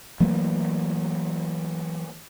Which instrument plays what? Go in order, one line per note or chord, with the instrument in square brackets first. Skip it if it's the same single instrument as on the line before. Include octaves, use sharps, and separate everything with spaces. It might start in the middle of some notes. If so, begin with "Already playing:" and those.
[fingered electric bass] E3 F#3 A3 A#3